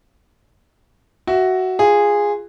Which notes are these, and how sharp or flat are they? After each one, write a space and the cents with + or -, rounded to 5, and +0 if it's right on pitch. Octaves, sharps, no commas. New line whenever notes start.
F#4 +10 E5 +0
F4 +0 G#4 -10